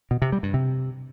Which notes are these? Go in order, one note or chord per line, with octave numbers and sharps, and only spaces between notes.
B2
C3
G3
G2
C3